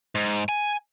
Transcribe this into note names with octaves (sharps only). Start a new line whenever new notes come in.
G#2
G#5